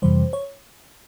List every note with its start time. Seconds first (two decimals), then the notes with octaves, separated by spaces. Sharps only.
0.02 F2 C3 E3 G3 C5
0.33 C#5